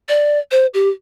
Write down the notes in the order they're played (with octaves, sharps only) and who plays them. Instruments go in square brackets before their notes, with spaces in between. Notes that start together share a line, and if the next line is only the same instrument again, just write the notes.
[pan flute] D5
C5
G4